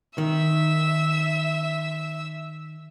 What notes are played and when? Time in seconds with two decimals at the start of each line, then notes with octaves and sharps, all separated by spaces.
0.18 D#3 E5 E6